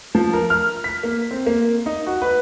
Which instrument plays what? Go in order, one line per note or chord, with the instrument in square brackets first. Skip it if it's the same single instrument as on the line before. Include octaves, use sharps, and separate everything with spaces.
[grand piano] F3
A#4
F6
B6
A#3
C4
A#3
D#4
F#4
B4